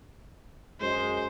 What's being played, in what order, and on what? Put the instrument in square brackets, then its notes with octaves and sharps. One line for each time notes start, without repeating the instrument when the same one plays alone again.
[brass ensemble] F#2 G#3 [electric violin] C5